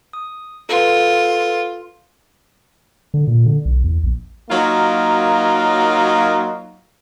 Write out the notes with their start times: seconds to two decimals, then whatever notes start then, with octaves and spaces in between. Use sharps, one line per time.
0.13 D#6
0.69 F4 A4 B4
3.14 D3
3.27 A#2
3.46 D3
3.65 B1
3.84 E2
4.03 A#1
4.50 F#3 A#3 D#4 F4 F#4 A#4